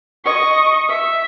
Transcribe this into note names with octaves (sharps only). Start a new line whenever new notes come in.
D#5 C#6
E5